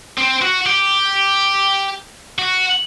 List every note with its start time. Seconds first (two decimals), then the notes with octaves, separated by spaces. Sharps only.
0.18 C4
0.42 F#4
0.66 G4
2.38 F#4